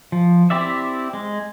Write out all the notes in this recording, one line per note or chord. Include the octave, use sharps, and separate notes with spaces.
F3
C4 E4 G4 D5 E5
G#3